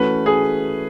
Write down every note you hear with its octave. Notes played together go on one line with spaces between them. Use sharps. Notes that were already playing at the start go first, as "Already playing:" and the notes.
Already playing: E3 A3 C#4 F#4 B4
G#4